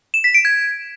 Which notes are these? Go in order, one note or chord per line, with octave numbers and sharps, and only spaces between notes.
E7
B6
D7
G#6